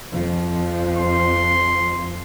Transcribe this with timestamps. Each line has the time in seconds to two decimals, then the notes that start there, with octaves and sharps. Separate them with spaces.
0.11 F2 F3
0.97 C6